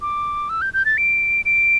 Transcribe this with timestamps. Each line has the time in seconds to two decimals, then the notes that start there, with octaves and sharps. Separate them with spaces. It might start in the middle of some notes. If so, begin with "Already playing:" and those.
0.02 D6
0.49 E6
0.62 G6
0.74 G6
0.85 A6
0.98 D7
1.45 D7